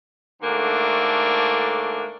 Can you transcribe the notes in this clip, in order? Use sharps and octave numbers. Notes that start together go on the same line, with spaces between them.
G#2 D3 A3 A#3 D4 F#4